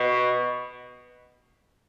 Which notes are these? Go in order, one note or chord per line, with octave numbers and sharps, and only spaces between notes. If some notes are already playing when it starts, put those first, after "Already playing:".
Already playing: B2